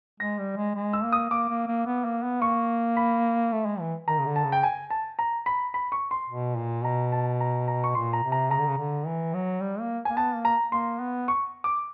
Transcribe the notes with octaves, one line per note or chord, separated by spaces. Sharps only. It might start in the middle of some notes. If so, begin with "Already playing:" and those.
G#3 A#6
G3
G#3
G#3
E6
A#3
D#6
A#3 D6
A#3
A#3
B3
A#3
B3
A#3 C#6
B5
A3
G#3
E3
D#3 A#5
C#3
D3
A5
C#3
G5
G#5
A5
A#5
B5
B5
C#6
C6
B2
A#2
B2 A#5
A5
A#5
A#5
C#6
A#2 C6
A#5
C3
A#5
C#3 A#5
D3
C#3
D3
E3
F#3
G3
A#3
A#3 G#5
B3 A5
A#3
A#5
A#3 C6
B3
C#6
D6